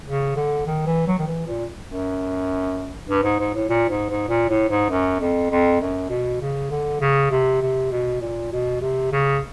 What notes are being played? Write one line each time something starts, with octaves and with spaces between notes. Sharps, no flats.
C#3
D3
D#3
E3
F#3
D#3
E3
A#2
F#2
G2
G#2
G#2
A2
A#2
G#2
G#2
A#2
A2
G#2
F#2
F2
F2
F#2
B2
C#3
D3
C#3
C3
C3
B2
A#2
B2
C3
C#3